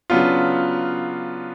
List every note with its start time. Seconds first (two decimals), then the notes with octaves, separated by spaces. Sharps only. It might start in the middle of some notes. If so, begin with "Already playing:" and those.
0.10 C#3 F#3 B3 D4 F4